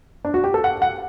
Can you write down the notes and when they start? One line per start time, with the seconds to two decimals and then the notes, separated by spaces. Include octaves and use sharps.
0.25 D4
0.34 F#4
0.44 G4
0.54 A4
0.64 F#5
0.82 F#5